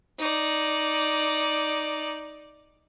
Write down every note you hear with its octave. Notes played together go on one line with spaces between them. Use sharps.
D#4 D5